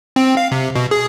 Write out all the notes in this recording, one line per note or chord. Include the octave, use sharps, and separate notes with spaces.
C4
F5
C3
B2
G#4